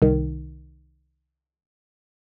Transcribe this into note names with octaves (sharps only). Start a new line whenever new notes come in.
C2 D#3